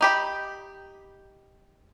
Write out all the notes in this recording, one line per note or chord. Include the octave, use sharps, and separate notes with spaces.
D#4 G4 B5